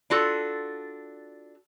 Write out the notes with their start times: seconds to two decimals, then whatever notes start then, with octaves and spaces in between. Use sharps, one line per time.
0.10 D4 F4 F#4 A4